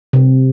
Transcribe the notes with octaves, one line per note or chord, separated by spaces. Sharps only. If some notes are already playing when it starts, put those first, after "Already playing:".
C3